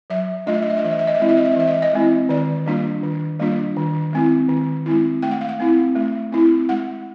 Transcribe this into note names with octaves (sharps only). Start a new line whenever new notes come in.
F#3 E5
A3 D4 F4 D#5
E5
D#5
E5
D#5
E3 E5
D#5
E5
D#5
E5
G#3 C4 E4 D#5
E5
D#5
E5
D#5
E3 E5
D#5
E5
D#5
G#3 C4 E4
D#3 D5
G3 A#3 D4 F4
D#3
G3 A#3 D4 F4
D#3
G#3 C4 E4
D#3
G#3 C4 E4
A3 G5
F#5
F5
F#5
C4 E4
A3
C4 E4
G#3 F#5